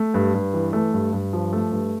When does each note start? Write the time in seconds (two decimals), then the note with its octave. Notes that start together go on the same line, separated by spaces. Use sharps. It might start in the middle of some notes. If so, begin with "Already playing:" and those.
Already playing: A3
0.14 G2
0.34 G2
0.54 E3
0.73 A3
0.94 G2
1.13 G2
1.33 F3
1.53 A3
1.72 G2